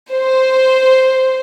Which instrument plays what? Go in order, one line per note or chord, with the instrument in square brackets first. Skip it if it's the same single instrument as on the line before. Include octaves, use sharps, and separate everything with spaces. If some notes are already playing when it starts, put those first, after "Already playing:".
[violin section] C5